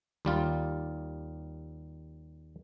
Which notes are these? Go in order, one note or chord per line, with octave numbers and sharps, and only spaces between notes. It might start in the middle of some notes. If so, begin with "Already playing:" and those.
D#2 G3 F4